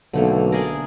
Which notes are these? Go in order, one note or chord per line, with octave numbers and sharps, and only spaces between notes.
B1 D3 A3 A#3
D4 G#4 A#4